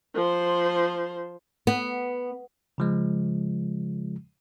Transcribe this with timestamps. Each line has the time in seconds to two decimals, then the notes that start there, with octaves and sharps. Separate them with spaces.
0.15 F3 C5
1.67 B3
2.78 C#3 F3 G#3